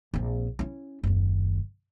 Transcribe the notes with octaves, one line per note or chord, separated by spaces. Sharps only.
A#1 C4
C#4 E4
F#1 D#2